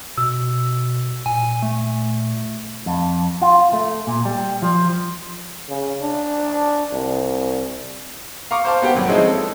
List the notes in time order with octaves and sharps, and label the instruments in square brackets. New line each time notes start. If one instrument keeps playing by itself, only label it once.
[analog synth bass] B2 [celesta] E6
[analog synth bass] A#2 [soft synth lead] G#5
[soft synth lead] A3
[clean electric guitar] F2
F4
A3
A#2
G3
F3
[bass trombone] C#3
D4
C2
[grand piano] F5 A#5 C#6 D6
C5 F5 A5
B3 G4 G5
G#1 F#3 G3
F3 G#3 C4 C#4 D#4 E4
A4